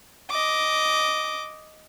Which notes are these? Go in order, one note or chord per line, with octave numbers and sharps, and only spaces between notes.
D#5 D6